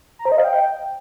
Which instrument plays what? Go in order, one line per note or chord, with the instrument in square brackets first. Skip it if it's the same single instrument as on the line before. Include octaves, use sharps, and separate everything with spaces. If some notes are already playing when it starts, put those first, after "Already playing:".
[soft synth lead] A#5
C5
D#5
F5
G5